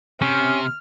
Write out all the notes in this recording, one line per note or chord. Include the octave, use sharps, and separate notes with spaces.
C3 C#4 F6